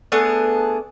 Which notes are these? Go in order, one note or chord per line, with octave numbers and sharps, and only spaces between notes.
A3 B3 D4 G#4